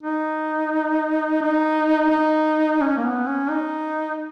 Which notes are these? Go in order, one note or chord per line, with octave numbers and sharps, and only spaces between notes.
D#4
D#4
D#4
C#4
A#3
B3
C#4
D#4